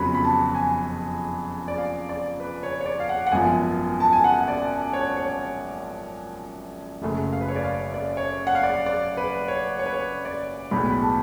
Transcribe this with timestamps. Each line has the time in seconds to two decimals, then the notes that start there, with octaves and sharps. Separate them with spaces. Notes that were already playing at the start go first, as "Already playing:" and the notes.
Already playing: F1 F2 C#3 F#3 B3 B5
0.15 B5
0.24 A5
0.55 G#5
1.68 D5
1.78 F5
2.09 D5
2.40 B4
2.63 C#5
2.81 C#5
2.86 D5
3.00 F5
3.09 F#5
3.27 F#5
3.32 G#1 F#2 F3 B3 G#5
4.00 A5
4.13 G#5
4.24 F#5
4.48 D5
4.93 C#5
5.17 C#5
7.02 F#1 F#2 C#3 F#3 A3
7.33 F5
7.41 B4
7.49 C#5
7.56 D5
7.63 F5
7.94 D5
8.17 C#5
8.47 F#5
8.55 F5
8.63 D5
8.86 D5
9.17 B4
9.48 C#5
9.79 C#5
9.86 B4
9.93 C#5
10.25 D5
10.71 B1 A2 G#3 B3 B5
10.90 B5
11.02 A5